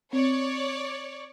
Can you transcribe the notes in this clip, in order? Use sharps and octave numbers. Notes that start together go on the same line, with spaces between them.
C4 C#5 D5